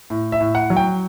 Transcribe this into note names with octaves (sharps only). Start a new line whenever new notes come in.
A2
E5
A2
F#5
F#3
G5